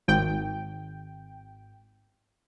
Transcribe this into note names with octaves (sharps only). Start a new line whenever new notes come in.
G#1 G5